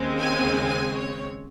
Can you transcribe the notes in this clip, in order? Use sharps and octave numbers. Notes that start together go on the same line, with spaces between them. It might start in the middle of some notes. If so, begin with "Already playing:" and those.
Already playing: D#2 C#3 G#3 C4
G#5
G#5
C#5